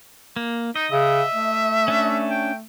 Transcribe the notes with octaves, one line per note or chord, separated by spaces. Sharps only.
A#3
D#4 D#5
C#3 E5
A3
C#4 D4
G5